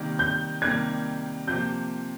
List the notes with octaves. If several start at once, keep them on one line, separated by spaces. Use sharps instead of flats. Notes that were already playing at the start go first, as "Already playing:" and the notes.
Already playing: C3 D#3 G3 A#3
G6
C3 D#3 G3 A#3 G#6
C3 F3 A#3 G6